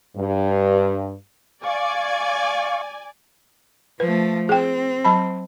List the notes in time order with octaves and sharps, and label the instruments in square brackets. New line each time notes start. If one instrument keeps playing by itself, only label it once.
[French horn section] G2
[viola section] D5 G#5 [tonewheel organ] F5 C#6
[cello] F3 A3 [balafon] B4
[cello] C4 [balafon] G#4 G5
[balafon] F#3 A5 B5